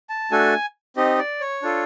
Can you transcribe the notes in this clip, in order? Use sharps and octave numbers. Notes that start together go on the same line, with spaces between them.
A5
A3 D4 F#4 A4 G#5
C4 D#4 G4 D#5
D5
C#5
D4 F4 A4